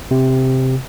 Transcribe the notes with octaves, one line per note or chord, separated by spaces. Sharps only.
C3